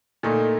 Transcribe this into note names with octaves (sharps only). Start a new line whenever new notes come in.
A#2 A3 D#4